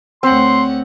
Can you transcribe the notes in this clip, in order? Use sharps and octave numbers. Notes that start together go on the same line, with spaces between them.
D2 C4 C#5 F#5 C6